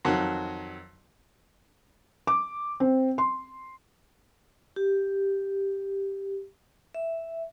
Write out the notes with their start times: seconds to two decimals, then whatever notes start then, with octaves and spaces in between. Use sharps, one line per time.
0.05 F2 D#3 F#3
2.27 D6
2.80 C4
3.18 C6
4.76 G4
6.95 E5